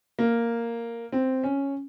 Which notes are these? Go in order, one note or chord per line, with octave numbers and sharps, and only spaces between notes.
A#3
C4
C#4